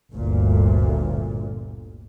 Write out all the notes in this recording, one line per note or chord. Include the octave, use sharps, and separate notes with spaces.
G1 D2 A#2